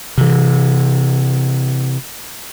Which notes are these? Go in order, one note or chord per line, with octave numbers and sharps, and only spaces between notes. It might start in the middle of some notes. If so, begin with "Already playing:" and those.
C3 E3